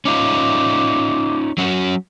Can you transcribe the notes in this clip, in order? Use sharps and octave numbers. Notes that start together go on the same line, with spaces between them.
C#4 D#4 F4 D6
F#3 C#4 F#4